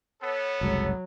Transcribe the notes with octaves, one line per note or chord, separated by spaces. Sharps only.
B3 A4 C#5
F#1 C2 F#3 G#3